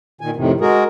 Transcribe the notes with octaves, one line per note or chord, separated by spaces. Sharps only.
A#2 D#3 G#5
F2 A2 C3 D#3
G#3 F#4 G#4 A#4